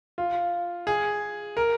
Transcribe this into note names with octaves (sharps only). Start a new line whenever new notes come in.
F4
G#4
A#4